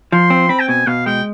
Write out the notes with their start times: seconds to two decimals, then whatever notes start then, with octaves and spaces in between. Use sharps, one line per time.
0.12 F3 C6
0.30 C4
0.49 C4 B5
0.60 G5
0.69 B2 G#5
0.87 B2 F5
1.06 G#3 G5